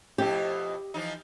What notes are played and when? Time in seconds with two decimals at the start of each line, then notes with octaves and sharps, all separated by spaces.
0.18 F2 B2 E4 G4
0.94 E3 F3 D#4